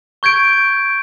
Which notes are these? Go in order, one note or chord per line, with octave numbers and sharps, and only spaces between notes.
C#6 G6 G#6 D7